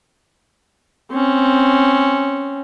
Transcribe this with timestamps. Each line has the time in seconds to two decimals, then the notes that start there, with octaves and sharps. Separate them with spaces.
1.12 C4 C#4